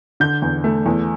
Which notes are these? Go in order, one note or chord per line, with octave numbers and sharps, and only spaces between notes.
D3 G6
E2
A3
E2